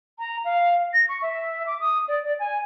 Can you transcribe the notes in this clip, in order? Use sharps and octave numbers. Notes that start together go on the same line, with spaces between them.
A#5
F5
A#6
C#6
E5
D6
D#6
D5
D5
G#5